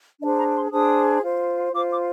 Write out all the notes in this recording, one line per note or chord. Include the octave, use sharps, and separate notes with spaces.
D4 G#4 C5 D#5
A#5
C6
D4 G#4 C5 D#6
F4 C5
F4 C5 D6
D6